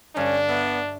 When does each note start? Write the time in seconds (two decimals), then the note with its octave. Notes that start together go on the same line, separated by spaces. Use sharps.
0.16 G2 D3 G3 C#4 D4
0.49 B3 C#5 D#5 E5